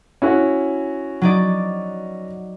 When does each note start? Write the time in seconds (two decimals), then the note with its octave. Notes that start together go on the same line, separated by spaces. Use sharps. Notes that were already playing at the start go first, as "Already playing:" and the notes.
0.22 C#4 E4 F#4
1.21 F#3 D#4 D5